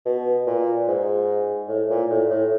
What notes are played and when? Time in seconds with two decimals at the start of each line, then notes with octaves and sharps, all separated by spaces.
0.06 B2
0.47 A#2
0.87 G#2
1.68 A2
1.90 A#2
2.10 A2
2.30 A2